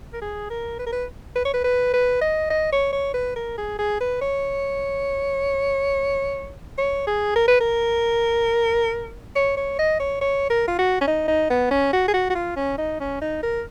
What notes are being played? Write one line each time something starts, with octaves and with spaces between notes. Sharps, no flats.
A#4
G#4
A#4
B4
A#4
B4
B4
C#5
B4
B4
B4
D#5
D#5
C#5
C#5
B4
A#4
G#4
G#4
B4
C#5
C#5
G#4
A#4
B4
A#4
C#5
C#5
D#5
C#5
C#5
A#4
F4
F#4
C#4
D#4
D#4
B3
C#4
F#4
G#4
F#4
F#4
F4
C#4
D#4
C#4
D#4
A#4